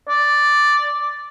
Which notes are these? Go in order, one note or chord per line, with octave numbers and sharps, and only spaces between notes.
D5